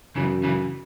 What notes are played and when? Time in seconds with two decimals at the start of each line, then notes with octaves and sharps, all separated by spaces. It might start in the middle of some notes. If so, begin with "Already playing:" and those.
0.16 F#2 C#3 E3
0.43 C#3 E3